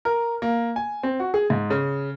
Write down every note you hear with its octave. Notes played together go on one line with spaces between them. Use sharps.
A#4
A#3
G#5
C4
F#4
G#4
G#2
C#3